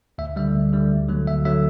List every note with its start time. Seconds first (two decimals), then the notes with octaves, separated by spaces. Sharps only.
0.18 D2 E5
0.36 D3 G3 E5
0.55 D2
0.73 D3 G3
0.91 D2
1.08 D3 F#3 A3
1.27 D2 E5
1.45 D3 F#3 A3 E5